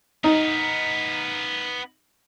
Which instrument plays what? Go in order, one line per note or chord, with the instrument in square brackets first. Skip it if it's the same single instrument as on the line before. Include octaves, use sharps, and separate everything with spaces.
[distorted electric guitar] B3 A#4 [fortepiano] D#4